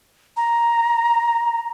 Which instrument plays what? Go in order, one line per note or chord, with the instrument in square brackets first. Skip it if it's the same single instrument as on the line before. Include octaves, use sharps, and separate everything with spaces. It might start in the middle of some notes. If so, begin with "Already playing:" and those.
[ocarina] A#5